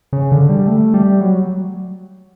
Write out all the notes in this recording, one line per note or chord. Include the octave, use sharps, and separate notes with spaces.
C#3
D3
G3
A3
G3
F#3